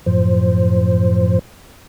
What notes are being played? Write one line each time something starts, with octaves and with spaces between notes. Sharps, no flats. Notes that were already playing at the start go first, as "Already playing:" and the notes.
F#2 A2 F3 C5